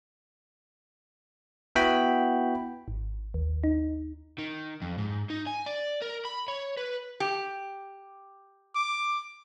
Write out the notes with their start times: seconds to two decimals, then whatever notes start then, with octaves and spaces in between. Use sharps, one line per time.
1.76 B3 E4 F#4 G5 B5
2.88 G#1
3.34 D#2
3.64 D#4
4.38 D#3
4.82 F2
4.98 G#2
5.30 D#4
5.47 G#5
5.66 D5
6.02 A#4
6.25 B5
6.48 C#5
6.77 B4
7.20 G4
8.75 D6